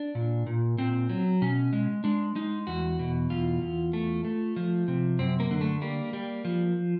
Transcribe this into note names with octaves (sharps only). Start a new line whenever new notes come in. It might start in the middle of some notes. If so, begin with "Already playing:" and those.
Already playing: D4
A#2
A#2
A#2 C4
F#3
B2 C#4
G#3
G#3 D4
G#3 D#4
E2 F#4
B2
E2 F4
E2
A3
A3
F3
C3
F#2 C4
A#3
D3
A3
G3 A#3
G3
F3